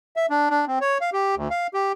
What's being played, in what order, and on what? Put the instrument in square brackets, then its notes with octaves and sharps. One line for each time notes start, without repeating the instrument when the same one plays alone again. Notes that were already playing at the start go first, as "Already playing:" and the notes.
[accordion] E5
D4
D4
C4
C#5
F5
G4
D2
F5
G4